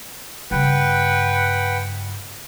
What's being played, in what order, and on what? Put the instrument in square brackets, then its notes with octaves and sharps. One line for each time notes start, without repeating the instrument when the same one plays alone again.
[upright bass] G2 C#3 [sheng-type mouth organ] B4 F#5 G5